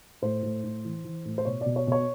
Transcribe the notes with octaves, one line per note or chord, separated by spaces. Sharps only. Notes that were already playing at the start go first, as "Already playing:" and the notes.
A2 C5
A2
A2
E3
E3
A2
C5
B2 C#5
B2 D5
C#5
B2 C#5